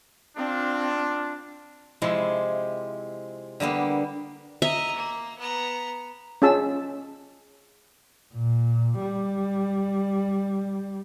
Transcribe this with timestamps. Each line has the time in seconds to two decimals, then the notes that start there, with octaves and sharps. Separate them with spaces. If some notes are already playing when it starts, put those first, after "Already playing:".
0.38 C4 D4 F4
2.02 C3 F3 G#3 E4
3.60 D3 G3 A#3 B3
4.62 D#5 E5 A#5
4.96 A#3
5.38 B3 A#5
6.42 C#4 F4 G#4 A5 E6
8.34 A#2
9.01 G3